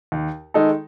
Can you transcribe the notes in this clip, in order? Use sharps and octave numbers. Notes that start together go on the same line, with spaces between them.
D#2
D#3 G#3 D#4 A4